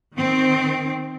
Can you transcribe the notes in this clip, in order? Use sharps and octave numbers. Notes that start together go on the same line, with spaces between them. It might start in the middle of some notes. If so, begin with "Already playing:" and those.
D#3 C4